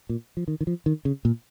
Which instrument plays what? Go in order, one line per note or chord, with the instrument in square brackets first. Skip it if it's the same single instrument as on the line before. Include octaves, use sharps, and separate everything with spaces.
[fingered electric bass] A#2
F3
D#3
D#3
F3
D#3
C#3
A#2